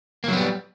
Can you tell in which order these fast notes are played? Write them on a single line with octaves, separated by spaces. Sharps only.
A#3 F#3 B3 G3